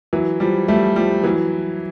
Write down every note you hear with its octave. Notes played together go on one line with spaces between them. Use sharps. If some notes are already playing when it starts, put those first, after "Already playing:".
E3 F#3
F3 G3
G3 A3
F3 G3
E3 F#3